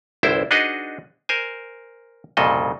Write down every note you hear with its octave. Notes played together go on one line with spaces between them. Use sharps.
G1 C2 E4 C5 G5
D4 D#4 F#4 G#4 B4 D#5
A#4 C5 G#5
C2 F2 A#2 C#3 A4 D#5